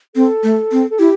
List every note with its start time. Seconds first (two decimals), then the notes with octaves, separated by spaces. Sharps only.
0.15 C4 A4
0.43 A3
0.72 C4
0.90 A4
0.99 E4 G4